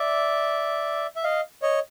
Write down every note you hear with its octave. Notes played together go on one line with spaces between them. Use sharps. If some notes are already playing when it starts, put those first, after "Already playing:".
Already playing: D5 E5
E5
D#5 F5
C#5 D#5